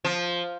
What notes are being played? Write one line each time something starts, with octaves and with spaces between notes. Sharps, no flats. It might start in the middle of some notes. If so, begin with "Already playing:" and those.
F3